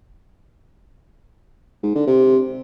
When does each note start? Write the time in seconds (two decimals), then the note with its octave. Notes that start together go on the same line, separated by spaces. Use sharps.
1.83 G#2
1.95 D3
2.07 C3